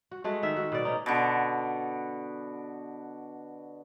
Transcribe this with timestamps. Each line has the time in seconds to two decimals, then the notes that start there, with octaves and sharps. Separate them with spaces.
0.11 F#4
0.24 G#3 A3 F#4
0.43 D#3 E5
0.57 F#4
0.72 B2 D5
0.85 C#4 D#4
1.06 B2 D3